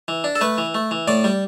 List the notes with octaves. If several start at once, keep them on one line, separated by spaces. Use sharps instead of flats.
E3
D4
A4
A3 B4
E3
A3
E3
A2 D5
G3